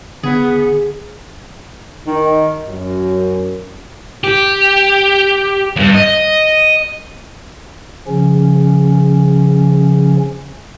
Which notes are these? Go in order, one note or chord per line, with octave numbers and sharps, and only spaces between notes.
D3 B3 G#4
D#3
F#2
G4
E2 G2
D#5
C#3 F3 C#4